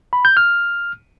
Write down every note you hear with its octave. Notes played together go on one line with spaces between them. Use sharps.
B5
G6
F6